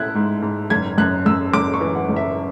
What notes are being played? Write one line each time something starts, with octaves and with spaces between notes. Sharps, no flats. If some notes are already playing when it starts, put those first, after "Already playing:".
Already playing: C#4 E4 F#6 G#6
G#2
G#2
F#1 G#6
F#2 F#6
F#2 E6
F#1 D6
C#6
E3
F#5
F#1
E5